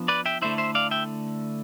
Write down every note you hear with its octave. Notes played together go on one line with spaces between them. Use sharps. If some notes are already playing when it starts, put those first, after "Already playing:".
Already playing: F3 B3 D4
B4 D5
E5 G5
D3 A3 E4 C5 E5
C5 E5
D5 F5
E5 G5